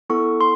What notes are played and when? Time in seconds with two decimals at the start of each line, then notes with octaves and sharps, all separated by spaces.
0.10 B3 E4 A4 C#6
0.41 C6